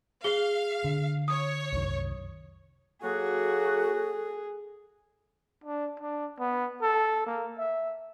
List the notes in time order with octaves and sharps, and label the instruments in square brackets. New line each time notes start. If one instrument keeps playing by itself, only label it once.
[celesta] G#4 G7 [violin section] F5
[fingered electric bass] D3
[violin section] C#5 [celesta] D#6
[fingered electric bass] C2 F#2 D#3
[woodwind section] F#3 A#3 F#4 [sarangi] G#4 [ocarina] A4
[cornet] D4
D4
B3
A4
A#3
E5